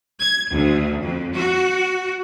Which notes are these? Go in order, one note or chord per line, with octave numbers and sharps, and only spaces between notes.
G#6
D2
F2
F#4